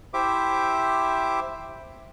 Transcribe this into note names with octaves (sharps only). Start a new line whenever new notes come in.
E4 G4 C5 E5 D6